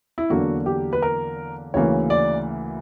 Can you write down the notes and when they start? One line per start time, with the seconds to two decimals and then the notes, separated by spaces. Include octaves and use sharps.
0.18 E4
0.30 E2 D3 F#3 A#3 F#4
0.66 G4
0.93 B4
1.02 A#4
1.74 D2 C#3 E3 A#3 C#5
2.10 D5